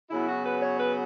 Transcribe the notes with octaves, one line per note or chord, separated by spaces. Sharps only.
C#3 F#3 B3 E4
F#4
B4
C#5
B4